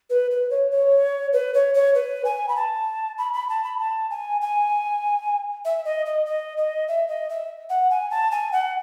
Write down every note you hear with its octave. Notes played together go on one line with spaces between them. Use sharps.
B4
B4
C#5
C#5
B4
C#5
C#5
B4
G#5
B5
A5
B5
B5
A5
B5
A5
G#5
G#5
E5
D#5
D#5
D#5
D#5
E5
D#5
E5
F#5
G#5
A5
G#5
F#5